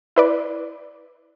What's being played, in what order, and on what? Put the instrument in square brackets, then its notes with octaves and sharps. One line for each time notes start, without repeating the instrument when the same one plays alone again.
[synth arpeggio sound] E4 B4 D5